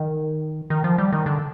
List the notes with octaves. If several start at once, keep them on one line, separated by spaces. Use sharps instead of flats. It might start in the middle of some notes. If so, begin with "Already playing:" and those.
Already playing: D#3
D#3
F3
G3
D#3
D3